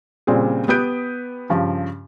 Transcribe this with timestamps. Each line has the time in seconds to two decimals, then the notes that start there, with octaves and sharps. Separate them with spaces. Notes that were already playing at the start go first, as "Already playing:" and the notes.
0.27 A#2 C#3 G3 C4 D4 G#4
0.68 B3 G4 B4 D#6 G6 D7
1.50 G2 C#3 F3